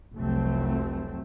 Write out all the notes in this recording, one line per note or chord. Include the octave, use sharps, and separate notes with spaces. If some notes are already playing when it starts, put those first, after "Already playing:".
F1 C2 F#3 A3 C4